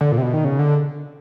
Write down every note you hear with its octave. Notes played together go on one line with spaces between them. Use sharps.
D3
A#2
C3
B2
D#3
C#3
D3